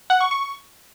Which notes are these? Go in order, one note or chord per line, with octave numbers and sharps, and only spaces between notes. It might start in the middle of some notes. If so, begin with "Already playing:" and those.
F#5
C#6
C#6